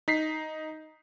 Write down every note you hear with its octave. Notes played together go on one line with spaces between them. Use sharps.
D#4 B6 C7